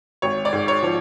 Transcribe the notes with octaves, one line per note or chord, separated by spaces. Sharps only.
G#1 C#5
D5
G#2
C#5
F3